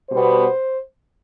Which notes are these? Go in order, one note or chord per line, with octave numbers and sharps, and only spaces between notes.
B2 G3 B3 C5